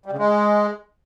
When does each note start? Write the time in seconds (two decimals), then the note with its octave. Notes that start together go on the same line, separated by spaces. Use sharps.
0.06 G3
0.12 C#3
0.18 G#3